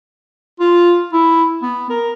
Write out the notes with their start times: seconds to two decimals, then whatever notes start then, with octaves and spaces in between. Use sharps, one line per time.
0.60 F4
1.13 E4
1.62 B3
1.90 A#4